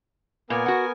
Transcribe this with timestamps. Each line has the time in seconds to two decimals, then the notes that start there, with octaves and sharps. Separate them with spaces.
0.50 A#2 B3 A#4 G#5
0.66 F#4 F#5